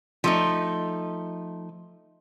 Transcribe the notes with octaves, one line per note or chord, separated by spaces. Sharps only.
F3 A3 D#4